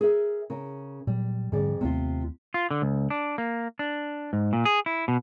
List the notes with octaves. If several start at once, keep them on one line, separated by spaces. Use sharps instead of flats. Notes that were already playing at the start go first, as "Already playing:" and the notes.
G#4 A#4 E5
C#3 A#4
A#2 F#3 G3
F2 G#2 D3 G3 G#4 D5
D#2 C3 A3 B3 F4
F4
D3
C#2
D4
A#3
D4
G#2
A#2
G#4
E4
B2